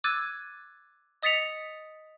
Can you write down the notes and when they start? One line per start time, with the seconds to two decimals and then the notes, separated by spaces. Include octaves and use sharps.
0.04 D6 E6 F#6 G#6 A6 D#7
1.23 D#5 D#6 A6 B6 C#7 F7